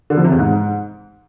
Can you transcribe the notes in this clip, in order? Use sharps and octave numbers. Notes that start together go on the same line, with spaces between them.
D3
F3
C3
E2
G#2